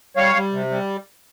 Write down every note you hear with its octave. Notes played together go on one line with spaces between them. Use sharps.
G3 C#5 F5
G3
C3
G3